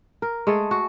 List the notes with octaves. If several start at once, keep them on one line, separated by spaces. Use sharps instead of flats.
A#4
G#3 A3 G#4 A4
F#4